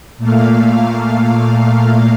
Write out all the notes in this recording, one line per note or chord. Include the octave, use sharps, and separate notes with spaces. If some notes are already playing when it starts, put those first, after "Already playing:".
A#2 A3 A#3 F5